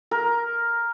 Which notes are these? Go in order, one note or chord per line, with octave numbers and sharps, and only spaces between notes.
A#4